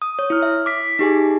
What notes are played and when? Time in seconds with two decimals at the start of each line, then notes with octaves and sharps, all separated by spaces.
0.02 D#6
0.19 C#5
0.30 E4 F6
0.42 E5
0.66 D6 B6
0.99 D#4 G4 G#4 G#5